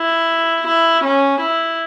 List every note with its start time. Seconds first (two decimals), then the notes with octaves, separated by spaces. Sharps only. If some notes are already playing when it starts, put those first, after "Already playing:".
Already playing: E4
0.67 E4
1.04 C#4
1.41 E4